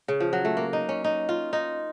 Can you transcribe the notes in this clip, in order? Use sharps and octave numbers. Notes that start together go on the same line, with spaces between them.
C#3
F3
F#3
A3
A#3
D#4
C#4
D#4
F4
D#4